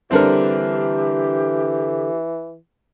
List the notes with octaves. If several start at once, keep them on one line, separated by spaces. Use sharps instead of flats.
D3 E3 G3 C4 D4 G4 A#4 F#5